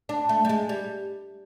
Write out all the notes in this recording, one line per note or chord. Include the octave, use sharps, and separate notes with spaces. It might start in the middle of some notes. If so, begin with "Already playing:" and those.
D4
A3
G3
G#3
G3